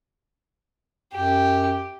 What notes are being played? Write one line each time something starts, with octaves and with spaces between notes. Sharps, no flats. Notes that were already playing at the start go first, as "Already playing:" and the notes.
F#2 G4